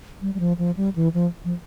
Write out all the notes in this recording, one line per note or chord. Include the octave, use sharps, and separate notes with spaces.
G3
G3
F3
F3
G3
E3
F3
F3